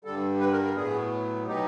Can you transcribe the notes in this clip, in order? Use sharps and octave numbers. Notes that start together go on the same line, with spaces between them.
G2 D3 G3 A4
B4
A#4
A#4
A2 F#3 B3 G#4
B2 F#3 B3 D#4 G4